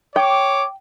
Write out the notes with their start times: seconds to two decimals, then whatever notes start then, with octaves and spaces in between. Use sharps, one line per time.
0.16 C#5 G5 D6